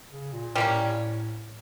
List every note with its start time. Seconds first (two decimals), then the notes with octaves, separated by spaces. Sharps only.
0.10 C#3
0.33 A#2
0.55 A2 G3 A#3 C#4